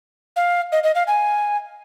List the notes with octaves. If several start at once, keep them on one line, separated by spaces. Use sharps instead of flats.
F5
D#5
D#5
F5
G#5